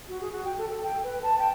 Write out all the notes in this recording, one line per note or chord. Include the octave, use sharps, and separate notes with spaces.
F#4
G#4
F#4
G5
A4
A4
G5
B4
A5
G5